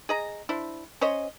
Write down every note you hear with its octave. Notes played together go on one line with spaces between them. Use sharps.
G#4 D#5 A#5
D4 E4 C5
C#4 C5 C#5 D#5